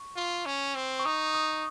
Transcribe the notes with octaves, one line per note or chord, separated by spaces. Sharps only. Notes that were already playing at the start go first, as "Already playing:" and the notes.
Already playing: C#6
F4
C#4
C4
C#6
D#4 D#6
D#6